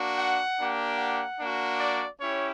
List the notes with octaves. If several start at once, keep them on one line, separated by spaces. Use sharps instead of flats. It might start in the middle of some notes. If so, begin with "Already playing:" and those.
Already playing: A#3 D4 F#4
F#5
A#3 D4 G4
F#5
A#3 D4 F#4
D5
C#4 E4 G4 C#5